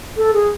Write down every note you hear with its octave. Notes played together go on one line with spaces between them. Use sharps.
A4
G#4